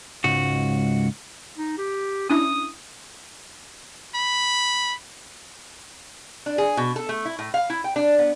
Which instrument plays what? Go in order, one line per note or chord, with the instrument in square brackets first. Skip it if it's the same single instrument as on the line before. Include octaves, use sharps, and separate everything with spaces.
[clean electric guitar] C#2 G#2 F#4
[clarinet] D#4
G4
[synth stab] C#4 D4 E4 [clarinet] D#6
[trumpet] B5
[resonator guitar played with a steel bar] D4
G#4
B2
A4
A3
E4
A2
F5
E4
G5
D4
B3